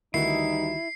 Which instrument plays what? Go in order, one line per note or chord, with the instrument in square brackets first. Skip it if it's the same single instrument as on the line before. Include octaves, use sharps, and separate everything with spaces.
[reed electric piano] D2 D#3 F#4 [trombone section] E3 G3 D#4 [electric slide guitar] E4 [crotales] C7